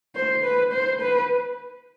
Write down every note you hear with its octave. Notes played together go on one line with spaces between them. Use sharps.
C5
B4
C5
B4